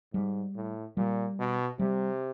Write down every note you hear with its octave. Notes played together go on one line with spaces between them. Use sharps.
G#2 G3
A2
A#2 G3
B2
C3 G3